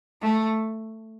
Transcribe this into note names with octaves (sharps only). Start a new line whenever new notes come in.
A3